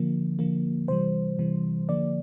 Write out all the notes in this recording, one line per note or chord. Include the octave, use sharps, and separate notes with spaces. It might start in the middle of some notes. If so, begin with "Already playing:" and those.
Already playing: D3 F3 A#3
D3 F3 A#3
C3 E3 G3 C5
C3 E3 G3
D3 F3 A#3 D5